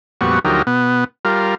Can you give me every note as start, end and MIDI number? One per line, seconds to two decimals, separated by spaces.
0.21 0.39 41
0.21 0.39 46
0.21 0.39 55
0.21 0.39 59
0.21 0.39 66
0.21 0.39 85
0.45 0.62 38
0.45 0.62 53
0.45 0.62 54
0.45 0.62 63
0.45 0.62 67
0.45 0.62 70
0.67 1.04 47
0.67 1.04 59
1.25 1.55 55
1.25 1.55 65
1.25 1.55 70